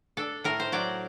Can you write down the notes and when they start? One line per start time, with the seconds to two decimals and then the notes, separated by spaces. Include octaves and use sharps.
0.17 D4 A4
0.44 A2 A#4
0.60 C5
0.72 F#3 D5